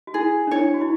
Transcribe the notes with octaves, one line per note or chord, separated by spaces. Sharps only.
F#4
E4 G#4
D4
E4 C#5
F#4
E4